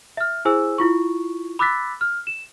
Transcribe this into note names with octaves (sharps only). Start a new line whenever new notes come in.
E5 F6
E4 G#4 C5 G#5 E6
E4 F4 C#6
B5 D6 E6 F#6 A6 B6
F6
E7